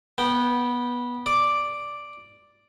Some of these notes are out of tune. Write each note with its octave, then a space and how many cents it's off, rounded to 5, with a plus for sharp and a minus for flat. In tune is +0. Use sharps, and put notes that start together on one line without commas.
B3 -15 G5 -5
D5 +0 D6 +0